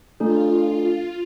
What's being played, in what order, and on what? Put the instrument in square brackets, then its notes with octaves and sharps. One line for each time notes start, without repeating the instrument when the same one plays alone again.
[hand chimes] A3 D4 A4 [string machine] F4